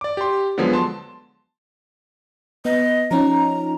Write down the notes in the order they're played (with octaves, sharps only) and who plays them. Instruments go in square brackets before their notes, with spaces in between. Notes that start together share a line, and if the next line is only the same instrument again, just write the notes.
[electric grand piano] D5 D6
G4 C6
D3 F3 F#3 G#3 B3
A5 C6
[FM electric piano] B3 [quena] D#5
[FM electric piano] F3 C#4 D#4 [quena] A#5